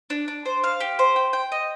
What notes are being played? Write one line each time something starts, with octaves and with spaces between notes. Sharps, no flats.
D4
D4
C5
F5
G4
C5
G5
G5
D#5